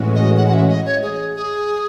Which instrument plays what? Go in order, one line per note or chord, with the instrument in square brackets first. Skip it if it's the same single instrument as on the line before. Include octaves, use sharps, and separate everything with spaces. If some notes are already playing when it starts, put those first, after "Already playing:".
Already playing: [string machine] A2 E3 G#3 C#4 F#4
[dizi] D#5
F#5
F#5
E5
D#5
C#5
G#4
G#4